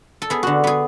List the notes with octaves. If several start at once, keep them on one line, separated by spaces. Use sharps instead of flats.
A4
B3 G#4
D3 F#4
B3 G#4